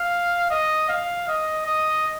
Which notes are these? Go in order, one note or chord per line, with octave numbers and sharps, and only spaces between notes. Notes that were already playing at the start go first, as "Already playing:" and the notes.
Already playing: F5
D#5
F5
D#5
D#5